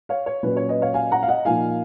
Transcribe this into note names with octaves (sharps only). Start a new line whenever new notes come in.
C#5 F5
C#5
A#2 F#3 C#4 B4
C#5
B4 D#5
C#5 F5
F5 G#5
F#5 A#5
F5
D#5 F#5
A#2 F3 A#3 D#4 F5 G#5